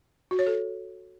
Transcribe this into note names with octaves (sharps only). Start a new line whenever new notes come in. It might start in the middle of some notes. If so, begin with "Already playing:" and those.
F#4
C#5
A4